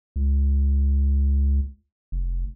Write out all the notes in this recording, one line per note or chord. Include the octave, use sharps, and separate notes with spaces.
C#2
F1